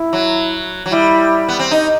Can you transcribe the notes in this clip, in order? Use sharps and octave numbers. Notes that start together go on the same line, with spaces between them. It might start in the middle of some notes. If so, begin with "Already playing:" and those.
Already playing: E4
F#3
F#3
G3 E4
B3
C4
D#4